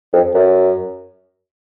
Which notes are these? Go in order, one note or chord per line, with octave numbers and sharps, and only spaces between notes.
F2
F#2